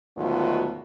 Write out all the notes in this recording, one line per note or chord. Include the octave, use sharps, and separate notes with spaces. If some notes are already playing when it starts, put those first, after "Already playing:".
D2 G#2 B2 D#3 F#3 F4